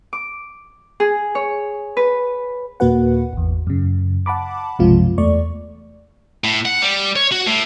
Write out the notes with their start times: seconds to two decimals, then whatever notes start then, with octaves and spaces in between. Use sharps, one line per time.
0.13 D6
1.00 G#4
1.35 C#5
1.97 B4
2.80 D#2 A#2 A#3 F#4 B4 F#5
3.33 G#1 E2
3.67 F#2 C#3
4.26 F#5 A5 B5 D6
4.79 B1 F#2 C3 F3 G#3 F4
5.18 E2 A3 D5 C#6
6.44 A2
6.66 F#5
6.82 G3
7.16 C#5
7.32 F#4
7.46 A2